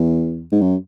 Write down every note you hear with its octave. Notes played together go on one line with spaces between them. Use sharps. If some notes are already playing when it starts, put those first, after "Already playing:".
Already playing: E2
G#2
F#2